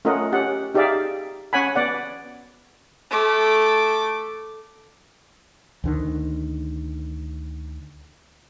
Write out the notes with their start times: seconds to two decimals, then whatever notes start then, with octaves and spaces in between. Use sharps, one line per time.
0.05 A3 C#4 F4 A#4 D#5 F#5
0.32 C#4 G4 F#5
0.74 D#4 G4 G#4 D5 E5 F5
1.53 C#4 C#5 F#5 G#5 B5
1.75 B3 D5 F#5
3.10 A3 D6
5.84 D2 D3 D#3